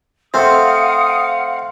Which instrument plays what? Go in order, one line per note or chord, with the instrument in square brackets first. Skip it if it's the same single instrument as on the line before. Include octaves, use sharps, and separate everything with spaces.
[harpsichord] A3 C4 [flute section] F5 F#5 [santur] C6 [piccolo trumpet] D#6